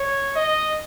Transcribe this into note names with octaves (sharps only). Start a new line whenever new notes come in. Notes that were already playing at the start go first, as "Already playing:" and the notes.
Already playing: C#5
D#5